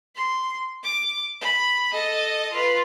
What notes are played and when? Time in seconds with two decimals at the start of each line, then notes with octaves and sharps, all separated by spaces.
0.15 C6
0.83 D6
1.41 B5
1.92 A4 D#5
2.52 F4 B4